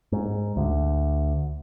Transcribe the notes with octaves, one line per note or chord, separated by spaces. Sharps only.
G#2
D2